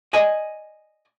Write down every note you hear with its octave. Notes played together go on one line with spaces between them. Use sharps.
D5 D#5 G#5